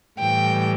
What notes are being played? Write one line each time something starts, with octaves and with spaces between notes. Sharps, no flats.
A2 E3 G3 G5